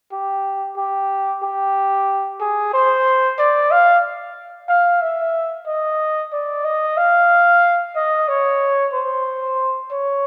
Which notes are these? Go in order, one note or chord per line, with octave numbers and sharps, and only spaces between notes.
G4
G4
G4
G#4
C5
D5
F5
F5
E5
D#5
D5
D#5
F5
D#5
C#5
C5
C#5